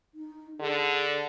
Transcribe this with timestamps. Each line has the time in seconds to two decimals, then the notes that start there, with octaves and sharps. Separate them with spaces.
0.15 D#4
0.60 D3 G#4